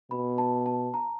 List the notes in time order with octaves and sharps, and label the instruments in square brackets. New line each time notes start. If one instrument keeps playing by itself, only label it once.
[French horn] B2 [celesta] B5
[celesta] A5
A5
A#5